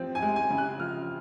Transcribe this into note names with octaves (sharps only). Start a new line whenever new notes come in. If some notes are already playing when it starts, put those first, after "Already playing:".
Already playing: F3 C4
G#5
G#3
G#5
C#3
F#6
F3 F6